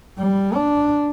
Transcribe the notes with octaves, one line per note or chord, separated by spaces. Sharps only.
G3
D4